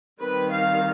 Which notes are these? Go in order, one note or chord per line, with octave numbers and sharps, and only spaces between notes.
D#3 G3 C4 B4
F5